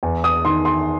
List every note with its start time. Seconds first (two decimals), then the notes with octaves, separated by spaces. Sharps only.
0.03 E2
0.24 D#6
0.45 D#3 C6
0.65 C6